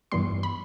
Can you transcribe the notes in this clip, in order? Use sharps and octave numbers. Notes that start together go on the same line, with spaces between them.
G2 E3 G3 B3 C6
B5